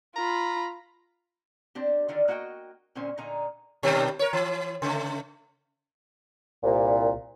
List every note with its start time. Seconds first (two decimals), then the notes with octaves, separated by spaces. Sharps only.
0.16 F4 A#5 B5
1.75 C4 D4 G4
2.08 D3 D#3 F4 D5
2.28 A#3 F#4 D#5 F#5 G5
2.95 A#2 D3 C4 C#4 C5
3.18 A#2 D3 D#4 A#5
3.83 B2 D#3 G3
4.19 A#4 C#5
4.33 E3
4.82 C#3 A3
6.64 C2 A#2